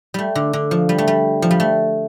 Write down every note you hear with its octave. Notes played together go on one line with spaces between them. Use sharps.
G3 A3
D3
D3
F3
G3
A3
G3
F3
G3
A3